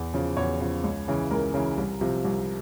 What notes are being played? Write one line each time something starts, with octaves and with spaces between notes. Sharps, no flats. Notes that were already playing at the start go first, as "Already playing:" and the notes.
Already playing: E2
C#3 F3
E2 C#5
C#3 F3
C#2
C#3 E3
C#2 A#4
C#3 E3
C2
C3 F3
C2